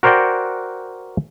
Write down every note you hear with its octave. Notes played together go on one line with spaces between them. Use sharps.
F#4 A#4 C5 D5 F#5 G5